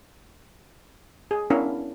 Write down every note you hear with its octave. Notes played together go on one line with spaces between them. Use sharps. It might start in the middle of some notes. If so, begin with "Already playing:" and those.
G#4
B3 C#4 D4 E4 A#4 F5